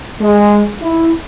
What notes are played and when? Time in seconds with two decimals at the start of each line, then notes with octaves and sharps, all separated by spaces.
0.20 G#3
0.82 E4